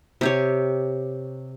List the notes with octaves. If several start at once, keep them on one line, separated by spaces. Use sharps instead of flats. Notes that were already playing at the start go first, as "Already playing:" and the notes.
C3 G4 C#5